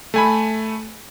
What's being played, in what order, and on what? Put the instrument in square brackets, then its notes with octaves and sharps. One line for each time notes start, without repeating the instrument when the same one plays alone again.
[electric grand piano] A3 G#5 B5